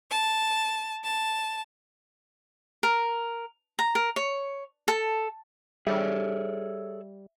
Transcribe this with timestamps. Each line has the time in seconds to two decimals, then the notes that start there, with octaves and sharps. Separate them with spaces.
0.11 A5
1.04 A5
2.83 A#4
3.79 A#5
3.95 A#4
4.16 C#5
4.88 A4
5.87 G3 G#4 A4 C#5 E5